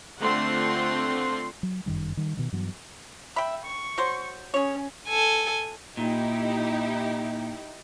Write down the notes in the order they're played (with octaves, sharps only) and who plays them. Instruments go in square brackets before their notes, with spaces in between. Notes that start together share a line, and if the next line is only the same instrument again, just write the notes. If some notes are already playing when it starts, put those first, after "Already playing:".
[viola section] D3 A3 C4 F4 F#5 C6
[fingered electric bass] F#3
G1 F#2 D#3 G3
D#3 G3
B2 D#3
G2 E3 F#3 B3
[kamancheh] E5 [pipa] G5 B5
[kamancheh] C#6
[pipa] F#3 C5
[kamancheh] C#4 [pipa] G#4 C#5
[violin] A4 G#5
[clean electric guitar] A#2 [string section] D#4 E4 G4